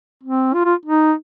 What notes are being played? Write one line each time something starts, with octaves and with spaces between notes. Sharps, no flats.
C4
F4
F4
D#4